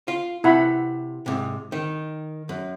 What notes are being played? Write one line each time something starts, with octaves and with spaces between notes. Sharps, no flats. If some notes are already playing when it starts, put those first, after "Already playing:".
F4
C3 E4 F#5 B5
G#2 C3
D#3
F#2